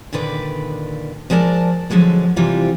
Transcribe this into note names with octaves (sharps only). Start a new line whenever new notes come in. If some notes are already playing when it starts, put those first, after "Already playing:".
A#2 D3 D#3 B4 D5
F3 G#3 A#4 D5 A5
D3 F3 F#3 G#3 A#3
C3 E3 G3 C4 F4